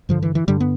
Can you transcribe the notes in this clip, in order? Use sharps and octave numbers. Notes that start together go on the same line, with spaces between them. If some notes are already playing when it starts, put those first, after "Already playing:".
G2 D3 F3
E3
E3
G2 D3 G3
B3